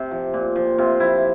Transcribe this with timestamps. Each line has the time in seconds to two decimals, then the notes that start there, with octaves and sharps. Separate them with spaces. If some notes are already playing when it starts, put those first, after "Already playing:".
Already playing: C3
0.11 F3
0.34 A#2
0.56 F3
0.78 C3 F4
1.00 F3 E4